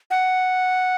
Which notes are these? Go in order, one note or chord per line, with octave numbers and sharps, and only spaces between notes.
F#5